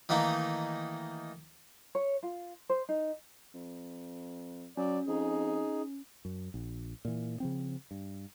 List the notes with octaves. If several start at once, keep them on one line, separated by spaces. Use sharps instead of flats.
D#3 E3 A3 A#3 D#4
C#5
F4
C5
D#4
F2
F#3 C#4 D5
F2 D#4 G#4
F#2
A#1
A#2 E3
C#3 F3 C4
G2